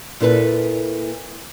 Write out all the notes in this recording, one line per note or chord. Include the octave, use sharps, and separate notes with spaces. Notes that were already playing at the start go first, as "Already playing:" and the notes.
A#2 E4 A4 B4